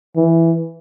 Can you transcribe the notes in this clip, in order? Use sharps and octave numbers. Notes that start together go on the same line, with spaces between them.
E3